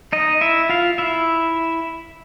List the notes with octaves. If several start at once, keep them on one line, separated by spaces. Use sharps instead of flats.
D#4 D#5
E4 E5
F4 F5
E4 E5